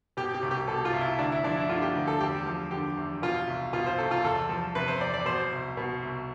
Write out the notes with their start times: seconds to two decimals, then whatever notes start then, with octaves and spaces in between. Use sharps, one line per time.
0.17 B2 G4
0.35 G4
0.42 C2
0.51 G4
0.68 B2 A4
0.85 F4
0.93 C2
1.01 E4
1.19 D2 D4
1.32 E4
1.44 F3 D4
1.57 E4
1.69 D3 F4
1.82 G4
1.95 D2
2.08 A4
2.21 E2 G4
2.46 F3
2.71 D3 G4
2.97 E2
3.22 B2 F4
3.47 C2
3.73 B2 F4
3.86 C5
3.98 C2 A4
4.11 F4
4.24 E2 A4
4.49 F3
4.75 C3 B4
4.88 C5
5.01 E2 D5
5.14 D5
5.26 B2 C5
5.52 C2
5.77 B2
6.03 C2